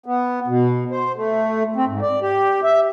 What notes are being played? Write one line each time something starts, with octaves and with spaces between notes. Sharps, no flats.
B3
B2
C5
A3
C4
G#2
D5
G4
E5